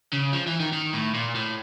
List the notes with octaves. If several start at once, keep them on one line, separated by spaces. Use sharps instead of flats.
C#3
F3
E3
D#3
D#3
A2
A#2
A2